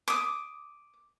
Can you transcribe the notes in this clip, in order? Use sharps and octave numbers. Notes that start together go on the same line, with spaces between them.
D6 D#6